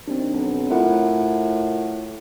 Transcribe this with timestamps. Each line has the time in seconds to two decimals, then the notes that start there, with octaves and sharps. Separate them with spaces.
0.08 D#2 C4 D4
0.34 B1
0.70 A2 F4 A#4 F#5